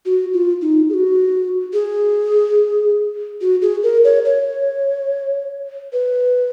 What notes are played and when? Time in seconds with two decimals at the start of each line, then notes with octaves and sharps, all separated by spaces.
0.06 F#4
0.33 F4
0.62 D#4
0.89 G#4
0.94 F#4
1.73 G#4
3.41 F#4
3.62 G#4
3.83 A#4
4.04 C#5
4.25 C#5
5.93 B4